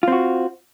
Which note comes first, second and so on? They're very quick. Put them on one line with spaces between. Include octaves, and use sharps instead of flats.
F4 C4 F#4